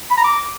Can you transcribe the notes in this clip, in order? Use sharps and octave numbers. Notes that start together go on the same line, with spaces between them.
B5
A#5
D6